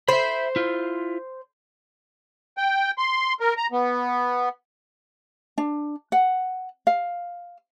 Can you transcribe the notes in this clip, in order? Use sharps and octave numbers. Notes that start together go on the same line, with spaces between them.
C5 E5 B5
E4 F4
G5
C6
A#4
A#5
B3
D4
F#5
F5